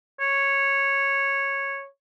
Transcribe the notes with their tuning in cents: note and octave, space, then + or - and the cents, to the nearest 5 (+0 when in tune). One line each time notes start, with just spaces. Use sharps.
C#5 -10